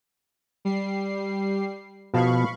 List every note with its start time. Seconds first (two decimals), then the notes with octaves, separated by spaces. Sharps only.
0.65 G3 C7
2.14 B2 F3 F5 A5 B5 C#6